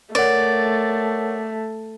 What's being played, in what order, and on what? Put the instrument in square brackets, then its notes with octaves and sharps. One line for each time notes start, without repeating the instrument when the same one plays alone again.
[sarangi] A3 [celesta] A#4 C#5 F#5 [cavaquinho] D5